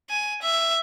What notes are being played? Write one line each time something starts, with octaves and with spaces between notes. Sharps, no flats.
G#5
E5